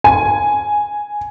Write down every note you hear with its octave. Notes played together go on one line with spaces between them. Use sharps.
G#5